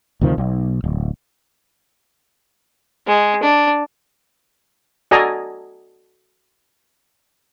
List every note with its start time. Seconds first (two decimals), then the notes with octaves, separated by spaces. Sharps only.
0.21 D2 C3 D#3 F3
0.38 B1
0.84 D1
3.07 G#3
3.43 D4
5.11 F#4 A4 D5 D#5 G#5 A#5